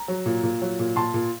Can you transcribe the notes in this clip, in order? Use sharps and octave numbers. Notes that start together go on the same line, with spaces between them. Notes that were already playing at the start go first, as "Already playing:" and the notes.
Already playing: A#5
F#3
A#2
A#2
F#3
A#2
A#2 A5 C6
A#2